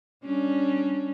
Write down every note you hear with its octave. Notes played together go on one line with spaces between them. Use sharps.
G3 C#4 D4